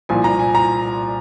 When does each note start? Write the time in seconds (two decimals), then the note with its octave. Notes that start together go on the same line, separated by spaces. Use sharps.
0.09 C2 A#2 F3 G#5
0.24 A#5
0.39 G#5
0.55 A#5